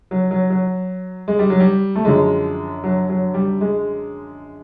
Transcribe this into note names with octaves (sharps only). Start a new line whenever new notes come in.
F#3
F#3
F#3
G#3
G3
F#3
G3
A3
F#2 D3 F3 G#3
F#3
F#3
G3
G#3